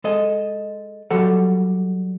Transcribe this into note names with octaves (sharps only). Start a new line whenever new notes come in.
G#3 A4 D#5
F#3 G3 A4 F#5